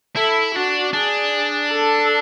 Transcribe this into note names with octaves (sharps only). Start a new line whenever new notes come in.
E4 A4
D4 F#4
D4 G#4
A4